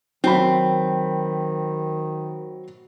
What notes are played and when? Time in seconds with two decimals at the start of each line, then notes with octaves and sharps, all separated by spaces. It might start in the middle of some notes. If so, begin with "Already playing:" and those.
0.24 D#3 F#3 C4 B5